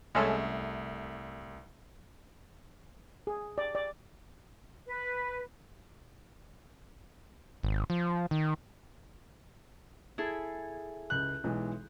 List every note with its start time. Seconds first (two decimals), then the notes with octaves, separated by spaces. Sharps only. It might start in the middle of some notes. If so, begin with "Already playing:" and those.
0.15 C2 G#3 A3 C#4 A4 E5
3.27 G#4
3.58 D5
3.75 D5
4.87 B4
7.63 G#1
7.90 F3
8.31 D#3
10.18 E4 G#4 A4
11.10 C#2 F#6 G6
11.44 B1 E3 G#3